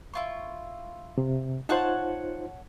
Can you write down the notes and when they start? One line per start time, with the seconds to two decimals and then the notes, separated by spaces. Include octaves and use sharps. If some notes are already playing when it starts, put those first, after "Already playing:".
0.14 E4 F4 C#6
1.18 C3
1.69 D#4 F4 C5 C#5 F#5 A5